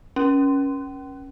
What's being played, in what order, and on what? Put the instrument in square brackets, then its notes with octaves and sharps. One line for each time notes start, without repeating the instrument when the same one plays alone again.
[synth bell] C#4